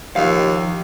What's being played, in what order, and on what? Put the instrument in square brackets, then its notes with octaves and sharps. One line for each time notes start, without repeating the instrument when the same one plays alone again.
[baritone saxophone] D#2 [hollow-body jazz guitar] F3 F5